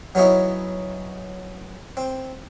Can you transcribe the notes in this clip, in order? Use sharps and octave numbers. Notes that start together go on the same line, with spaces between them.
F#3 B3 C#4 D#4 E4
C4